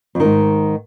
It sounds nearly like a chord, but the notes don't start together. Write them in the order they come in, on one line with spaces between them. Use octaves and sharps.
F2 D#3 G#2